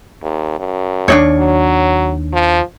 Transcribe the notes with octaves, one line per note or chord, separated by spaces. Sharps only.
D#2
F#2
D#2 D4 D#4 C#5
F#3
F3